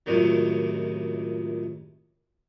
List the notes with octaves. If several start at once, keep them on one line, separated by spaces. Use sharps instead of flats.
C#2 F#2 A2 C3 D#3